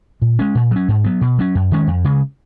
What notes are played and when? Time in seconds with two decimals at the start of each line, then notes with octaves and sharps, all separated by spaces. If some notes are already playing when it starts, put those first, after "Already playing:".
0.22 A#2
0.39 G#3 C#4
0.55 A#2
0.71 F#3 C#4
0.88 G#2
1.04 F#3 B3
1.21 B2
1.38 F#3 C#4
1.55 F#2
1.72 D#3 G#3 C#4
1.87 F2
2.04 C#3 G#3